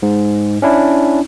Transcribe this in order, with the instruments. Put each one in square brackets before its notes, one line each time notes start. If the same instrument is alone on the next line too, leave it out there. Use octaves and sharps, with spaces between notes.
[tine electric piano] G#2
C#4 D4 E4